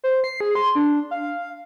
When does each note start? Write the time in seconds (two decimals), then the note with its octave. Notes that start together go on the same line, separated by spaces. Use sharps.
0.04 C5
0.24 C7
0.41 G#4
0.55 C6
0.75 D4
1.11 F5